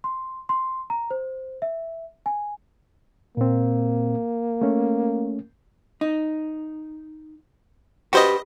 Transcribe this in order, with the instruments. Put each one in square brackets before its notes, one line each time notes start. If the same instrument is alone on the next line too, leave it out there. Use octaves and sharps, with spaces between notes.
[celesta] C6
C6
A#5
C5
E5
G#5
[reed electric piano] A#2 C4 [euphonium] A#3
[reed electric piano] A3 C#4
[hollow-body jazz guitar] D#4
[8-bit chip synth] F#4 C5 D#5 [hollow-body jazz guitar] G4 B4